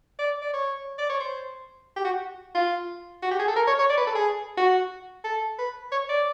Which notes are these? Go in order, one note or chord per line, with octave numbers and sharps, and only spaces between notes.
D5
D5
C#5
D5
C#5
C5
G4
F#4
F4
F#4
G4
G#4
A4
A#4
C#5
C#5
D5
B4
A4
G#4
F#4
A4
B4
C#5
D5